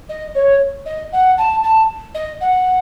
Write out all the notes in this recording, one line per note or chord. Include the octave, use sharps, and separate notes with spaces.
D#5
C#5
D#5
F#5
A5
A5
D#5
F#5